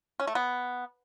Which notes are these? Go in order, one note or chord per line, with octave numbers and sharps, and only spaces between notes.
C#4
A3
B3